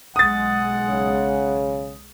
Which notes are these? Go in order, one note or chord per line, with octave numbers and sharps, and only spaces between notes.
B1 G#3 F#5 D#6 A6
C#3